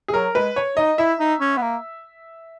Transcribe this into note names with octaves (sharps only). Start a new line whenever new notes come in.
G#4
F#3 A#4
G#3 B4
C#5
D#4 D#5
E4 E5
D#4
C#4
B3
A#3